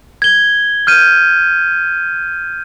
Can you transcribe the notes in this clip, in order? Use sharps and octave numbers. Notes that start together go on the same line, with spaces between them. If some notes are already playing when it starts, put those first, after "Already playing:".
G#6 G7
F6 G6 D#7